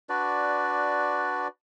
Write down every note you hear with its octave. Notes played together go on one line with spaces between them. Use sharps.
D4 F#4 B4 D5